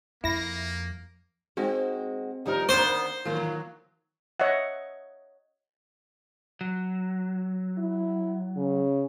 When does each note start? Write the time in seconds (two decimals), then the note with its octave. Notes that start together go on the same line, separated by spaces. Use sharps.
0.24 F2 A#3 E4 A#6
1.57 G#3 C4 D#4 F#4
2.46 D#2 F3 G3 D4 D#4 A#4
2.69 D2 D#3 A#3 B3 D4 C5
3.25 D#3 E3 F#3 A#3 F4
4.40 C#5 D#5 E5 F#5
6.61 F#3
7.78 E4
8.56 C#3